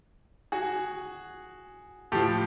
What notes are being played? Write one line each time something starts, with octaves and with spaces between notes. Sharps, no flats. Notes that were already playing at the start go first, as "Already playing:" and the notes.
F#4 G#4
A2 F3 G4 A4